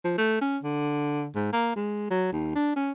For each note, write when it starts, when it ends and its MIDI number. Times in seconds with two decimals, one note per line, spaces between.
0.05 0.13 53
0.18 0.38 57
0.41 0.58 61
0.63 1.28 50
1.35 1.50 44
1.53 1.74 58
1.76 2.10 56
2.11 2.29 54
2.32 2.52 39
2.55 2.73 62
2.76 2.92 61